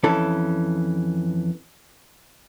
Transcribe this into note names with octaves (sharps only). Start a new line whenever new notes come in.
F2 E3 C#4 A4